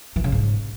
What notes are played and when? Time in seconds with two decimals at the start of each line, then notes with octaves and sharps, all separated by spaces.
0.16 E3
0.24 C#3
0.32 G#2